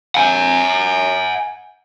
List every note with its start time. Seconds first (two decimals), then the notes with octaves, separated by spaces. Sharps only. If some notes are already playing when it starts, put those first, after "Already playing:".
0.15 F#5 G#5